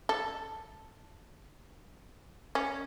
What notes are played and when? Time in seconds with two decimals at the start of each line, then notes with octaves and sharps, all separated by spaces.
0.09 A4
2.55 C#4